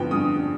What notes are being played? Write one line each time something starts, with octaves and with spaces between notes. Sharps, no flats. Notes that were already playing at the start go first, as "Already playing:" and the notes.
Already playing: G2 D3 F3 B3 G5
G2 D#6